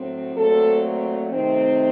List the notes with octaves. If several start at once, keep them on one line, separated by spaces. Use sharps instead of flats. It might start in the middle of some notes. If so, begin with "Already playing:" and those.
Already playing: A2 F#3 C4
A#2 F#3 A3 C4 A4
C3 D#3 A3 C4